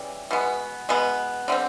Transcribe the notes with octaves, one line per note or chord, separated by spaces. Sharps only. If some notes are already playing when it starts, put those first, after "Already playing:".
Already playing: C#3 E3 G3
B2 G#3 B3
B2 G#3 B3
D3 G3 C4